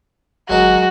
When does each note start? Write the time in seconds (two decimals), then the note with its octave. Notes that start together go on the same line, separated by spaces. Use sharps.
0.49 G1 F#3 G#3 F#4 A#4